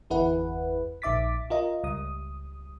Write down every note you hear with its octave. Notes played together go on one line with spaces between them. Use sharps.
G1 E2 E4 G#4 B4 F#5
A#1 D#4 E5 D6 A6 B6
F4 A#4 D#5
C#2 G3 D#6